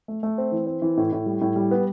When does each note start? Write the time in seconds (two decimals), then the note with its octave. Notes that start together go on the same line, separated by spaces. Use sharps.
0.08 A3
0.23 A3
0.38 C4
0.52 E3
0.67 C4
0.82 E3
0.97 A2
1.12 A2
1.26 G3
1.41 A2
1.56 G3
1.71 B3